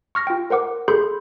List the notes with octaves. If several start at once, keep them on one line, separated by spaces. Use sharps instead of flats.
C#6 F6 A#6
F4 G5
A#4 C5 F#5 D6
G#4 A4 B5 C6 G6